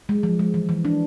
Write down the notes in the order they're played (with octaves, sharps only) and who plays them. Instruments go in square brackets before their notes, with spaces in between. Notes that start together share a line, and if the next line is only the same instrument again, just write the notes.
[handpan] G#3
F3
G#3
E3
E3
D4